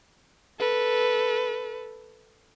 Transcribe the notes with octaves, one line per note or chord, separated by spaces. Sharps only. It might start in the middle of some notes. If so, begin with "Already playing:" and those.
A4 B4